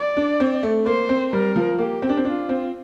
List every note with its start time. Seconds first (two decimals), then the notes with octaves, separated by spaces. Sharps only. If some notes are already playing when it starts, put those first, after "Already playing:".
Already playing: D5
0.17 D4
0.40 C4
0.63 A3
0.86 A#3 C5
1.09 C4
1.32 G3 A#4
1.56 F3
1.78 A#3 G4
2.02 C4
2.09 D4
2.17 C4
2.25 D4 F4
2.49 C4